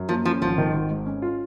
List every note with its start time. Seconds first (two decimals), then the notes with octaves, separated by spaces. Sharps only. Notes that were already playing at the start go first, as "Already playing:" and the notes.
Already playing: F#2
0.09 F3 A#3
0.25 F3 C#4
0.42 G#1 F3
0.58 D#3
0.74 G#1
0.90 G#2
1.06 C#4
1.22 F4